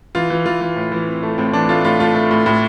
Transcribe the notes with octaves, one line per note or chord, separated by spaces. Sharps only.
E3 F4
E3
E3 F4
E3
A2
E3
C4
A3
A2 C4
E3 D4
A3 F4
A2 F4
A3 F4
A3
A2
A2